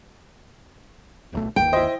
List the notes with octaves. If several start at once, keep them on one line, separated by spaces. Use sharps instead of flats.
D1 B1 A3
G1 D#2 G5
E4 C5 D#5